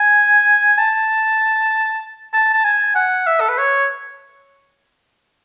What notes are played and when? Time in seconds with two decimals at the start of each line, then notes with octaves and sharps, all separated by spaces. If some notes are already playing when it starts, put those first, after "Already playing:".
Already playing: G#5
0.78 A5
2.33 A5
2.54 A5
2.64 G#5
2.95 F#5
3.27 E5
3.40 A4
3.49 B4
3.58 C#5